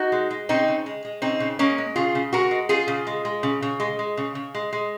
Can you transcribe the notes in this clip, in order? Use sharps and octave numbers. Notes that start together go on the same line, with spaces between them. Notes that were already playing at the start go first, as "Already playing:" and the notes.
Already playing: D#4 F#4
G#3
G#3
C#3 C4 D#4
C#3
G#3
G#3
C#3 C4 D#4
C#3
G#3 A#3 C#4
G#3
C#3 F4 G#4
C#3
G#3 F#4 A#4
G#3
C#3 F4 G#4
C#3
G#3
G#3
C#3
C#3
G#3
G#3
C#3
C#3
G#3
G#3